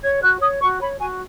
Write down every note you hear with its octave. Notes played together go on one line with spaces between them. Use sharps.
C#5 G#6
F#4 F#6
C#5 D#6
F#4 C#6
C#5 B5
F#4 G#5